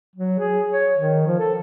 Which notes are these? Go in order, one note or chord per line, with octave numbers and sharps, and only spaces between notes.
F#3
G#4
C#5
D#3
F3
A4